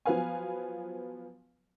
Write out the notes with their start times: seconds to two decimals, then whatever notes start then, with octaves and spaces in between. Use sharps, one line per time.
0.05 F3 F#3 B3 B4 F5 G#5